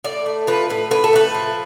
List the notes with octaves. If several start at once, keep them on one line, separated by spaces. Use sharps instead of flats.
A2 D5
A3
F3 B4
A2 B4
A2 B4
A4
A3 B4
F3